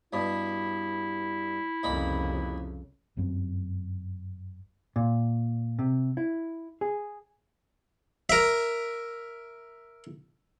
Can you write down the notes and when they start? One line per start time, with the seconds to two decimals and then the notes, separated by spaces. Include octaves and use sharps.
0.13 G2 B2 E4
1.83 C2 F2 A#2 C#3 D#5 B5
3.17 G1 F#2 F#3 C4
4.96 A#2
5.79 C3
6.17 E4
6.81 G#4
8.30 A#4 E5